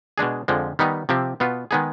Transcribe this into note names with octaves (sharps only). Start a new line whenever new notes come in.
B2 G#3 D4 G#4
F2 D3 F3 G#3
D#3 G3 B3 D#4
C3 F3 C4 G4
B2 B3 F4
D#3 G#3 B3 D#4 G#4